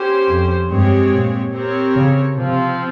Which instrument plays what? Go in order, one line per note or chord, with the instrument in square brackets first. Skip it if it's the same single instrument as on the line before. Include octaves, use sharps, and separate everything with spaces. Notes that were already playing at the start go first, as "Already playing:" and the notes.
Already playing: [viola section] C#4 G4 C5
[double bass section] F2
[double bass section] G2 [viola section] G#3 C4 G4 C#5
[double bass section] A#2
[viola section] C4 G4 A#4 C#5
[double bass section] C#3
[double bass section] C3 [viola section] F3 C4 F4